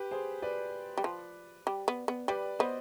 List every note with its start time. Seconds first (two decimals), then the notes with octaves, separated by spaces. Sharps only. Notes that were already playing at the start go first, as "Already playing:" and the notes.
Already playing: G4 B4
0.11 G#4 C5
0.42 B4 D5
0.98 G3
1.04 F3
1.67 G3
1.88 B3
2.08 B3
2.28 G3 B4 D5
2.59 B3 C5 D#5